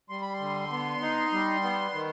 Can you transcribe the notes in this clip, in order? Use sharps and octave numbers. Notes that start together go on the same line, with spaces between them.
G3 C6
B5
C6
D3
B3
D#4
G3
B3
D#3